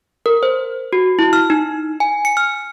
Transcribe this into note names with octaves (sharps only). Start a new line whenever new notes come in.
A#4
C5
F#4
E4
F6
D#4
G#5
C#7
F6